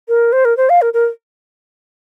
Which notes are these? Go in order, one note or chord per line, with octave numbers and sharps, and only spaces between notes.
A#4
C5
A#4
C5
F5
A#4
A#4